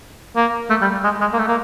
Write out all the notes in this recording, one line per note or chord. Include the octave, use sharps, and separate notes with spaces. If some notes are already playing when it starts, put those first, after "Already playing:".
A#3
A3
G3
G#3
G#3
A#3
A3
A#3